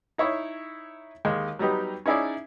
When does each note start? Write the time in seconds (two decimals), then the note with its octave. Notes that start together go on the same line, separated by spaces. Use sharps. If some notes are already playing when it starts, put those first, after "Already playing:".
0.18 D#4 E4 C#5
1.25 D#2 G#3
1.59 F#3 G3 B3 D#4 G4
2.06 C#4 D#4 E4 G#4 D5